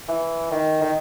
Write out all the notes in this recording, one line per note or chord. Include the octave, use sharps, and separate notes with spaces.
E3
D#3
D#3